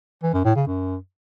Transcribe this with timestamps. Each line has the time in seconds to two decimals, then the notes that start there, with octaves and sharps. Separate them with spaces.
0.23 E3
0.34 F#2
0.45 A2
0.55 C#3
0.66 F#2